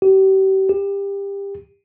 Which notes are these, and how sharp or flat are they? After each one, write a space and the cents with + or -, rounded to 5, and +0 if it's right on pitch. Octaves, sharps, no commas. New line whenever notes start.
G4 -35
G4 +25